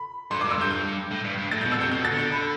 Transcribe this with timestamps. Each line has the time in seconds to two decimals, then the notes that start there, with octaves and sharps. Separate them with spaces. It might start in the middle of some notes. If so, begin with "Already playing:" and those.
Already playing: B5
0.31 G2 C6
0.41 G2 D6
0.51 E6
0.58 G2 G6
0.71 G6
1.11 A2
1.24 G2
1.38 G2
1.51 A2 A6
1.61 G6
1.65 B2
1.72 E6
1.78 C3 G6
1.91 B2 G6
2.05 A6
2.12 D3
2.19 G6
2.32 B5